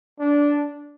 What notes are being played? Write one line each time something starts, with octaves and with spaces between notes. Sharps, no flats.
D4